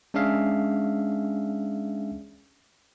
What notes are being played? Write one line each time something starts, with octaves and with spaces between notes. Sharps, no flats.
G#3 C#4 D4 G#4 E5 F5